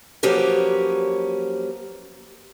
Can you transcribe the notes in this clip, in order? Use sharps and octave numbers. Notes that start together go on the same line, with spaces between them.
F3 F#3 A#3 C#4 G4 B4